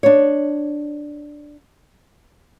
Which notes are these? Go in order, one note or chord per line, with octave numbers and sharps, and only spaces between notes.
D4 C#5